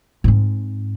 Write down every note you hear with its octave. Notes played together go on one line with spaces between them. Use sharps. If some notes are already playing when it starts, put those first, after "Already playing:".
G#2 C4